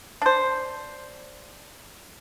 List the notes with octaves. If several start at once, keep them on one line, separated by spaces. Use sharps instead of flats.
D4 C5